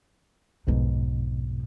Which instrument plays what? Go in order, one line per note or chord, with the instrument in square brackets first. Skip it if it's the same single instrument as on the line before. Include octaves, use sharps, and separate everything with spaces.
[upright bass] B1 D#4 [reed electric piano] F2 G#2 B2